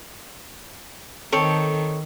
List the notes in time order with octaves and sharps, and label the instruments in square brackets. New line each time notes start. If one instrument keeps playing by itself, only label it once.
[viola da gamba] D#3 [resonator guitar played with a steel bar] C4 A4 C#5